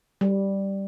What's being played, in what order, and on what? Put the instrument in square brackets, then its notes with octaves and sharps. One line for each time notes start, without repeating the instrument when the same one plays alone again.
[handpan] G3